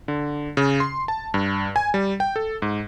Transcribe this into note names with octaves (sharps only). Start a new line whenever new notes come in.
D3
C#3
C6
A5
G2
G#5
G3
G5
A4
G#2